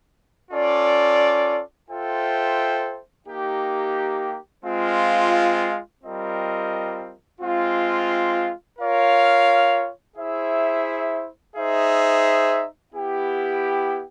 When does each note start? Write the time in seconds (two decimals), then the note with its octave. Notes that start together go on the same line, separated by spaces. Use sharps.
0.51 C#4 F4 A4 D5
1.89 F4 A4 C5 E5 G5
3.27 A#3 D#4 G4
4.65 G#3 C4 F4
6.03 G3 C4 F4 A#4 D#5
7.41 G#3 C4 F4
8.79 F4 A#4 C#5 F5
10.17 E4 G#4 C5 E5
11.55 D#4 G#4 C5 E5
12.93 B3 E4 G4